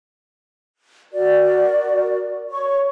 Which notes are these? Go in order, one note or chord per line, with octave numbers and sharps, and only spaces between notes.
F#4 A#4 D5
C#5 C#6